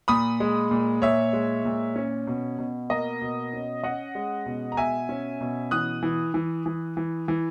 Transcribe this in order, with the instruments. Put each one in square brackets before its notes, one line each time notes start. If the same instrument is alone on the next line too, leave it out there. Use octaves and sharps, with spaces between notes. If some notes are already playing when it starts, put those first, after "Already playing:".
[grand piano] A#2 B5 D#6
G#3
A#2
A#2 C#5 E5
G#3
A#2
C#4
B2
B2
A#3 D#5
B2
C#4
C#4 D#5 F#5
G#3
B2
A#5
B2 E5 G#5
C#4
B2
E3 D#6 F#6
E3
E3
E3
E3
E3